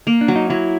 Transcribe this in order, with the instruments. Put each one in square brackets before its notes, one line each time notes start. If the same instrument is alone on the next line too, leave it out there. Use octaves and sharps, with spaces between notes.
[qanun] A#3
[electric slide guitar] D4
[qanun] F#3
[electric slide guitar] D#4
[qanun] F#3 [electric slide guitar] E4